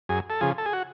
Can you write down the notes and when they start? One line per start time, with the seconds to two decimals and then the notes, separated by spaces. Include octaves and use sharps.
0.09 F#2 G#4
0.30 A4
0.41 C#3 F3 G#4
0.58 A4
0.66 G#4
0.73 F#4